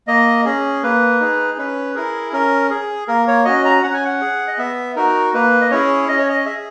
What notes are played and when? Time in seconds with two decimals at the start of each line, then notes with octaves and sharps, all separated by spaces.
0.07 A#3 D#5
0.45 C#4 G#4
0.83 A#3 B4
1.20 D#4 G#4
1.58 C#4 B4
1.95 E4 G#4 A#4
2.33 C#4 A#4
2.70 G#4
3.08 A#3 A#4
3.27 C#5
3.45 C#4 F#4 D#5
3.65 A#5
3.83 C#4 F#5
3.94 G#5
4.05 F#5
4.21 G#4
4.47 D#5
4.58 B3 E5
4.96 D#4 F#4 A#4
5.34 A#3 B4
5.61 D#5
5.70 C#4 E4 G#4 C#5
6.09 C#4 D#5
6.18 C#5
6.29 D#5
6.46 G#4 E5